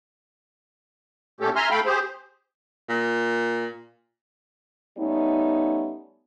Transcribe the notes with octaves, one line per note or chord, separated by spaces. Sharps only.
A#2 A3 C#4 G4 A4
E5 G#5 A#5 C6 F6
A3 A4 F5 G5 B5
G4 G#4 C5
A#2
G3 A3 B3 C#4 D#4